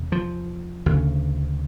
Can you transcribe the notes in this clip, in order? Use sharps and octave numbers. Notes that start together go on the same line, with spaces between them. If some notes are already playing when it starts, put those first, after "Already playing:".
Already playing: E2 C3
F3
D2 C#3